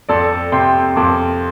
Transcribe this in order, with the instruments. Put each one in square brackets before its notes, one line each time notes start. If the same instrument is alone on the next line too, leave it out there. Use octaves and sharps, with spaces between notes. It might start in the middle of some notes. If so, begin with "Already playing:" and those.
[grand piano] F2 A4 D5
C3 G5 C6
F2 A5 D6